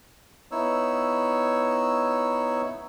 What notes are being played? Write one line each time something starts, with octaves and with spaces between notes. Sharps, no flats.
B3 D#4 E4 C#5 E6